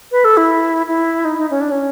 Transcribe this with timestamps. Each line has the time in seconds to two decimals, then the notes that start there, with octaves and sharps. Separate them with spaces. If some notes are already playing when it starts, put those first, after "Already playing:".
0.12 B4
0.25 A4
0.37 E4
0.88 E4
1.25 D#4
1.38 D#4
1.50 C#4
1.61 D4
1.71 C#4